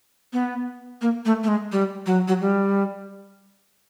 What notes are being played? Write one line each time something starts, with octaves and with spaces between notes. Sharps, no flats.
B3
A#3
A3
A3
G#3
G3
F#3
F#3
G3